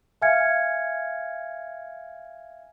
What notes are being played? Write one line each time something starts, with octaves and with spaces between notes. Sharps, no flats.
E5 F5 G#5 F6 G#6 C#7